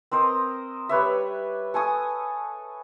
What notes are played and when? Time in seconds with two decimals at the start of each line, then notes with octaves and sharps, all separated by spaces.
0.11 C4 A#4 C5 D#5
0.89 G3 B4 C#5 E5
1.74 A4 G#5 C#6 D#6